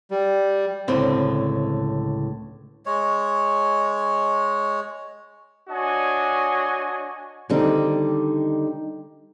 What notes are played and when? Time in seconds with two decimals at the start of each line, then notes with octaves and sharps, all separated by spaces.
0.11 G3
0.88 C#2 A2 D3 C4
2.86 G#3 C#5
5.69 D4 F#4 C#5 D#5 G#5
7.50 D3 D#3 G3 C4 D#4